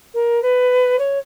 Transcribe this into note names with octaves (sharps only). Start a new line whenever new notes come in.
A#4
B4
C#5